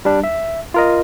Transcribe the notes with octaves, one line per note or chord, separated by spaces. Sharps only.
G3 D4
E5
F4 A#4 D#5